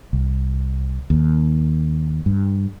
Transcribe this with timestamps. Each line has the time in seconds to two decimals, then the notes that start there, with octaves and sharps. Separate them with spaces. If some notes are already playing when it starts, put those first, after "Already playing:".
0.13 C2
1.10 D#2
2.26 G2